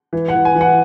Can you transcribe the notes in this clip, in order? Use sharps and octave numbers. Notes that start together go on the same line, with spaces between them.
E3
F#5
E3
G#5
E3
F#5